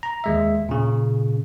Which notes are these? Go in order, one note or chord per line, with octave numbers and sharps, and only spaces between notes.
A#5
D#2 G#3 E5
A#2 C#3